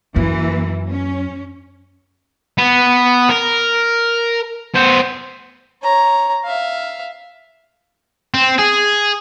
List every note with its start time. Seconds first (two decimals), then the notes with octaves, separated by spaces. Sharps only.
0.16 F#2 E3 A#3
0.89 C#4
2.58 B3
3.29 A#4
4.75 B3 C5
5.83 C#5 A#5
6.44 E5 F5
8.34 C4
8.59 G#4